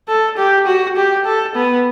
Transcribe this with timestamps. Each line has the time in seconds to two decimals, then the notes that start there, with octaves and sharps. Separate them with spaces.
0.08 A4
0.37 G4
0.67 F#4
0.96 G4
1.25 A4
1.55 B3